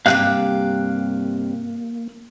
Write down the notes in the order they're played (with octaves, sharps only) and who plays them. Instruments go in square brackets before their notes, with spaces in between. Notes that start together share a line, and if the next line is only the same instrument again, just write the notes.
[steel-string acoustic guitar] G2 C3 G4 [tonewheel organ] A#3 [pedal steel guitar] F5 F#6